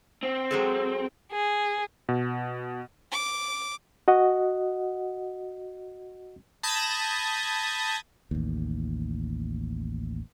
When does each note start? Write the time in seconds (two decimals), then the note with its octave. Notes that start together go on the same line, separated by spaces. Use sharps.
0.23 C4
0.51 F#3 G#3 A4
1.31 G#4
2.09 B2
3.11 D6
4.08 F#4 D#5 F#5
6.63 A5 B5 D#6 G6 G#6 A#6
8.31 A1 D#2